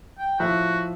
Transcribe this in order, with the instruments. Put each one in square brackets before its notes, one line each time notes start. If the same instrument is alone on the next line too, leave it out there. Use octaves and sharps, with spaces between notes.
[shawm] G5
[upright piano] A2 F3 E5 [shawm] F#4